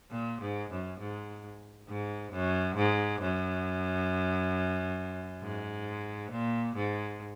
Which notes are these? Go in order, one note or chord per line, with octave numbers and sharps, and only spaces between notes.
A#2
G#2
F#2
G#2
G#2
F#2
G#2
F#2
G#2
A#2
G#2